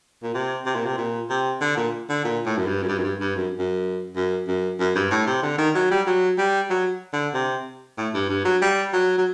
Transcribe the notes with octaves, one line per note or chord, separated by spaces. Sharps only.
A#2
C3
C3
A#2
C3
A#2
C3
D3
A#2
D3
A#2
A2
F#2
G2
F#2
G2
F#2
G2
G2
F#2
F#2
F#2
F#2
F#2
G2
A2
C3
D3
D#3
F#3
G3
F#3
G3
F#3
D3
C3
A2
G2
G2
F#3
G3
F#3
F#3